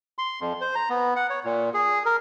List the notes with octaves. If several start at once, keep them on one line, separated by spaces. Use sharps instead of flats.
C6
F2
C5
A#5
B3
F#5
C#5
A#2
G#4
A#4